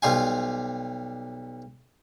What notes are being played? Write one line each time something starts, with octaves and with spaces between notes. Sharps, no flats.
B1 G3 F4 G#5